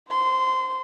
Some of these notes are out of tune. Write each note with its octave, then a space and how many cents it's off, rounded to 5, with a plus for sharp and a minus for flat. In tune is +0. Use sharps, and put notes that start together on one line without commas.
C5 +0 C6 -20